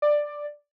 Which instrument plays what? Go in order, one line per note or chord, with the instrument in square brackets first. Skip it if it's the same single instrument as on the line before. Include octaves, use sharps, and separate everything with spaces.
[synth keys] D5